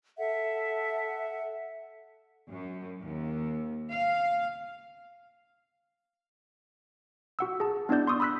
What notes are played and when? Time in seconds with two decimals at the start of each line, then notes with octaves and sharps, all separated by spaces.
0.18 A4 E5 F#5
2.50 F#2
3.01 D#2
3.92 F5
7.39 F#4 F#5 E6
7.60 G#4 A5
7.89 B3 D4 E4 D5 G6
8.07 C6 C#6 D#6 E6
8.20 B5 D#6 E6 F#6 B6